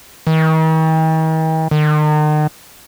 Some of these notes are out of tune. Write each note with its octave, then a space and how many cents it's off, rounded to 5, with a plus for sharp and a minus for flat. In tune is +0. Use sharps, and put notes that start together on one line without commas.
D#3 +45
D#3 -40